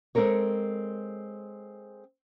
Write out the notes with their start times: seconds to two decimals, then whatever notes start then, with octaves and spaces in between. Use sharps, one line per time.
0.15 G#3 C4 A4 A#4 C#5